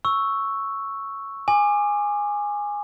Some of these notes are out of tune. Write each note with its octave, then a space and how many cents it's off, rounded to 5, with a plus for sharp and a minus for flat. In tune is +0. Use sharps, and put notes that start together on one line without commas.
C#6 +0 E6 +0
G#5 -10 D6 +25